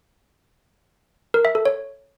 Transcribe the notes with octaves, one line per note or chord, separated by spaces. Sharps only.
A#4
E5
A4
C#5